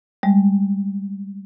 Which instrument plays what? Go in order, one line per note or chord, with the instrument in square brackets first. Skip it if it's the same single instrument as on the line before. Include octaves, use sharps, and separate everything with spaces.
[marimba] G3 G#3